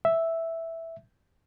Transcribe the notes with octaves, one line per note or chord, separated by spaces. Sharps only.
E5